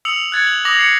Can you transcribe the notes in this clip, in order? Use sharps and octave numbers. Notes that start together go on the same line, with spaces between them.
D#6 E6 C#7 F7 F#7
F#6 G#6 A6 C#7
F7 F#7
D6 D#6 A#6 F7 F#7
C7 C#7